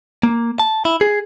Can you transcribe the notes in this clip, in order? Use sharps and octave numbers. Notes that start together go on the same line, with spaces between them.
A#3
A5
E4
G#4